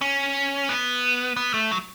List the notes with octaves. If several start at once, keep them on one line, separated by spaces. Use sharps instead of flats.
C#4
B3
B3
A3
F#3